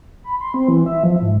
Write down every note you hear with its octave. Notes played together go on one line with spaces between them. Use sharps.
B5
C6
C4
E3
E5
F3
G#2